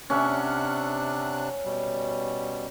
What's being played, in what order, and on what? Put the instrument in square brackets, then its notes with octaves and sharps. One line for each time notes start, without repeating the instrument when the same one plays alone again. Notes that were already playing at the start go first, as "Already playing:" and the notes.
[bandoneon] C3 D4 F#6 [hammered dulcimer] C#4 E5 F#5
[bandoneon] B2 G3